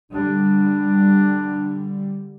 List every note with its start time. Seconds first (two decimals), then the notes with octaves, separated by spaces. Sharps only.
0.12 D3 G3 D4